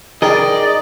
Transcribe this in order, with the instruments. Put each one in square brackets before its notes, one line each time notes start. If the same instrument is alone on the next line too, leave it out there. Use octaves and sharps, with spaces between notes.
[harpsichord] D#3 [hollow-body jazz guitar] G#4 A#4 [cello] D5 [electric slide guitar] D#5